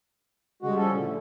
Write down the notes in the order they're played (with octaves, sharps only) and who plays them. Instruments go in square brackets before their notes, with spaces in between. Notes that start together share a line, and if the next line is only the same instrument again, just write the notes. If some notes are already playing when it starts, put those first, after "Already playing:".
[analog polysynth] C#3 G3 [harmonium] G#3 F#4
[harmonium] F3 C#4 A4
[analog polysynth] A2 [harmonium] D3